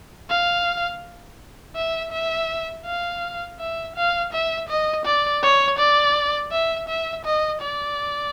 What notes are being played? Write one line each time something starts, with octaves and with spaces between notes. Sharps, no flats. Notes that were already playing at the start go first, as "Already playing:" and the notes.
F5
E5
E5
F5
E5
F5
E5
D#5
D5
C#5
D5
E5
E5
D#5
D5